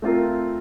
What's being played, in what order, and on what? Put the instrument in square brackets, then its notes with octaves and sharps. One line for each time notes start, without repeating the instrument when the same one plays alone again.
[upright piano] A3 C4 F4 A#4